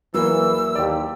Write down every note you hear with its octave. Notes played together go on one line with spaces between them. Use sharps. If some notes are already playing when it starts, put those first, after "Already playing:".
E2 E3 F#3 A#3 E6
D#2 G4 D5